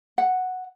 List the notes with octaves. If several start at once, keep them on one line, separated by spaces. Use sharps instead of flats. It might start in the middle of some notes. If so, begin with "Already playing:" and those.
F#5